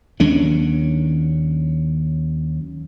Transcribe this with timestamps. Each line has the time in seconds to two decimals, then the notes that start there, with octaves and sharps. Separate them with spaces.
0.20 D#2 F#3 C#4 D4